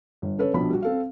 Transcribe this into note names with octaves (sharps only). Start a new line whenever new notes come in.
G1
C#3 A4 B4 C#5
A#1 B2 D4 B5
G3 F#4
C4 A4 F5